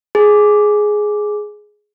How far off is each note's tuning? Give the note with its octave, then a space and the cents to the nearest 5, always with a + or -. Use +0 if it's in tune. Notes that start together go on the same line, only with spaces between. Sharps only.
G#4 +10